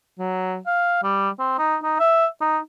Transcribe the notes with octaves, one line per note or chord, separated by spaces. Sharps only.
F#3
F5
G3
C4
D#4
D#4
E5
D#4